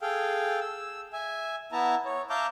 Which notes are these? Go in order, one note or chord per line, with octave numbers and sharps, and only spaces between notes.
G#4 A4 F5 G5
E6
E5 G#5
B3 E4 E5 A5 A#5
C#5
E5 F5 A5 A#5 D6 G6